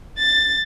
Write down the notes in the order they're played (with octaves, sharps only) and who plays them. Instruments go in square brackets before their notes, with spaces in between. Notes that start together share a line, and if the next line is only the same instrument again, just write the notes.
[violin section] A6